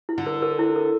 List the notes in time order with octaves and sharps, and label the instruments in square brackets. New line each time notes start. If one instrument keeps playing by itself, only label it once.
[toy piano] E4
[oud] D3
[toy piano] A#4
A#4
E4
A#4